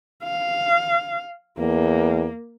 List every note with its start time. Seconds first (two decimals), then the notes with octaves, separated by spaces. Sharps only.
0.23 F5
1.58 E2 A#3